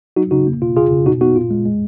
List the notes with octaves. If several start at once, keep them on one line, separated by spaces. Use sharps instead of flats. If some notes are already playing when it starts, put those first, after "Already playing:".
F#3 D#4 F#4
C#3 D#4 F#4
A#3
B2 F4
C#3 F4 G#4
C#3
B2 D#4 F#4
B3 D#4 F#4
A#2 F4
G#3
G#3